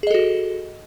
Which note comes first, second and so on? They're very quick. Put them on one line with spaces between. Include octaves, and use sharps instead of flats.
G#4 D#5 A4 F#4